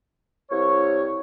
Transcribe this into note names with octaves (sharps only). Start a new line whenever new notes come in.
C2 C#5